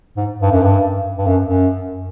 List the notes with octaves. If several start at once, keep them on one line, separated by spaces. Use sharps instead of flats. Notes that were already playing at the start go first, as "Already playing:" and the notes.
G#2
G2
F#2
G2
G2
F#2
F#2